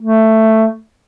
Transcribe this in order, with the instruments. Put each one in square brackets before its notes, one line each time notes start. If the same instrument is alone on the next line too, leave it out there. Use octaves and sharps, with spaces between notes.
[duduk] A3